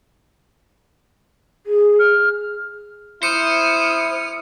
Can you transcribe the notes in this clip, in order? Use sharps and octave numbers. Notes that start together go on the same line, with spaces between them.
G#4
F6
E4 C5 D#6 F6 C#7